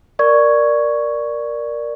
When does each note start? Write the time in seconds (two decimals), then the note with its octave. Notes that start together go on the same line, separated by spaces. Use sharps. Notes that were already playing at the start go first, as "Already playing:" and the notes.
0.19 A#4 D5 C#6 G#6